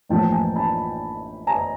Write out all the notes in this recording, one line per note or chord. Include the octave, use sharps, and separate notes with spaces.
A1 A2 F3 A#3 G5 A5
G#5 A#5
A5 B5
G#5 A#5